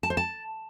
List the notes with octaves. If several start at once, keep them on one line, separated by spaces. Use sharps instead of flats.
A5
C5
A5